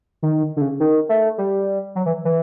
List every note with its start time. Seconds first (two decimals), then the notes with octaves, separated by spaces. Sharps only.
0.22 D#3
0.56 D3
0.61 C#3
0.80 D#3
1.09 A3
1.38 G3
1.95 F#3
2.06 E3
2.25 E3